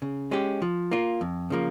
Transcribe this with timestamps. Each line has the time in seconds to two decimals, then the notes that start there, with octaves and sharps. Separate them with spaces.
0.02 C#3
0.31 G#3 C#4 G4
0.62 F3
0.91 A#3 F4
1.21 F2
1.50 C#3 F3 A#3